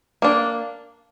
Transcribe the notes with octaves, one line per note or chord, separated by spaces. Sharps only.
A#3 D4